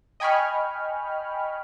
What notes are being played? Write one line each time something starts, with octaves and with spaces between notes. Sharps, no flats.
D#5 G5 G#5 B5 C#6 F6